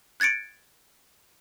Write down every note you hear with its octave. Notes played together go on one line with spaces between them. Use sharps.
F#6 G#6 A6 C#7 D7